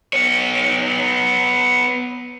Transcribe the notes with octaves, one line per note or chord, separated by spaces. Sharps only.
B3 C#5